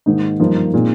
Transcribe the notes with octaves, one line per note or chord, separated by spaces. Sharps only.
G#2 D#3 A#3 D#4
G2 F3 A#3 D#4
A#2 G#3 C4 D#4